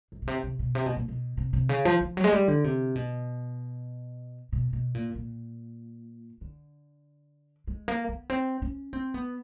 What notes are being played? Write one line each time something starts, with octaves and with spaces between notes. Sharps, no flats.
F#2
B2
C3
C3
B2
C3
B2
A#2
B2
C3
C3
C#3
F3
F3
F#3
G#3
G3
D3
C3
B2
B2
B2
A#2
A#2
D3
G#3
A#3
B3
C4
C#4
C4
B3